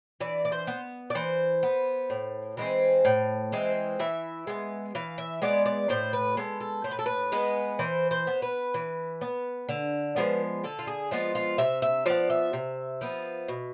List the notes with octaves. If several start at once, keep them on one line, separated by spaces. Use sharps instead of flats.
E3 D5
D5
C5
B3
D5
E3 C5
B3
A2
E3 G#3 C4
A2
E3 G#3 C4
E3 E5
G#3 B3
E3 F5
E5
G#3 B3 D5
D5
A2 C5
B4
G#3 B3 A4
A4
A2 C5
B4
A4
B4
G#3 B3
E3 C5
C5
B3
B4
E3
B3
D3
F3 G#3 B3
D3 A4
F4
G#4
F3 G#3 B3 F4
F4
C3 E5
E5
F3 B3 D5
E5
C3
F3 B3
B2